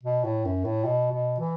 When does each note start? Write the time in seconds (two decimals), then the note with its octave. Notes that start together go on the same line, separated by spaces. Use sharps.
0.03 B2
0.24 A2
0.45 F#2
0.65 A2
0.85 B2
1.12 B2
1.39 E3